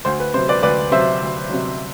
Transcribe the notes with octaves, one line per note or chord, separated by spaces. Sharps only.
D2 C5
B4
C3 F#3 C5
B4 D5
D2 B4 D5
C3 F#3 C5 E5
D2
C3 F#3